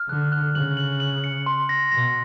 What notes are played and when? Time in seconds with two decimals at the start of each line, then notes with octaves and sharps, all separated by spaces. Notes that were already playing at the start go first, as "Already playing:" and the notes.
Already playing: F6
0.08 D3 F#6
0.32 F#6
0.55 C#3 F#7
0.77 F#7
1.00 F#7
1.24 C#7
1.46 C6
1.69 A#6
1.92 B2 A#6